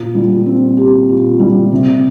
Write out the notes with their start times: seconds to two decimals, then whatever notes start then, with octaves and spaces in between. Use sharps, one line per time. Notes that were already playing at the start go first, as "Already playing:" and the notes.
Already playing: A#2
0.15 G3
0.46 C4
0.77 G4
1.09 A#2
1.40 G3
1.72 C3